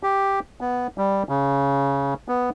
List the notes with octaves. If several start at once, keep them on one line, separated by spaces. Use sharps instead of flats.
G4
B3
G3
C#3
B3